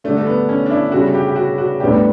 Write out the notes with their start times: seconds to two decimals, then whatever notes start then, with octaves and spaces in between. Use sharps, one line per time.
0.04 D3 G3 A3 D4
0.17 A3
0.27 B3
0.49 C#4
0.66 D4
0.70 E4
0.92 C#3 G3 C#4 F#4
1.08 F#4
1.14 G4
1.28 G4
1.36 F#4
1.58 F#4
1.80 A2 G3 B3 D4 G4